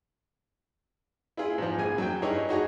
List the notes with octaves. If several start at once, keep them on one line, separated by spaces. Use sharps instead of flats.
E4 F4 G#4
G#2 F3
A#1 G#4 G#5
F#3 G5
G2 D#4 E4 G#4 C#5
D#4 F#4 G#4 C#5